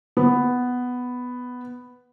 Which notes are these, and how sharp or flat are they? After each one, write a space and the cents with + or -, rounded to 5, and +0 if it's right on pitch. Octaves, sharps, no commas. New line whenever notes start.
B3 +5